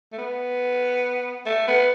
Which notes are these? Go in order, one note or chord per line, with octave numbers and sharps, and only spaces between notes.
A3
B3
A3
B3